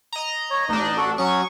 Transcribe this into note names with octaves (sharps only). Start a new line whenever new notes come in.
D#5 A#5
C#5
A1 D4 D#4 D#5
F#4 A4
F#3 C#4 C#6 D#6